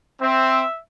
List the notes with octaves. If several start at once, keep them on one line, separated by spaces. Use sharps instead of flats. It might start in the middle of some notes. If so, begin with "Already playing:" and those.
C4 E5